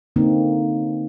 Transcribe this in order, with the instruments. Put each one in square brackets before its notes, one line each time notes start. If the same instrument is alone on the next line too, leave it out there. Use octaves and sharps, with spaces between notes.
[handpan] D3 A#3 C4 D#4